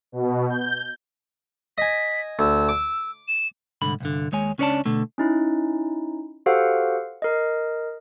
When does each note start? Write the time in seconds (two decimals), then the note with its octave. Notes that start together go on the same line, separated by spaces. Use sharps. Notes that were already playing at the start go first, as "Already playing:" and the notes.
0.12 B2
0.50 G6
1.78 D#5 G#5 B6
2.39 D2 E6
2.69 D6
3.28 E7
3.82 C2 G#2 D3 B5
4.00 C2 G2 D3
4.32 D#2 G#3 C#5 G#5
4.58 C#2 C#4 D4 C#5 D5 A5
4.85 B2 D3 A3
5.18 C#4 D#4 E4
6.46 F#4 G4 A4 C5 F5 F#5
7.22 A#4 D#5